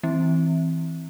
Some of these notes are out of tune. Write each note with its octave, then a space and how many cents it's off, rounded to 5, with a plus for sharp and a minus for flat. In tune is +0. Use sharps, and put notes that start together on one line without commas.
E3 -15 C4 +0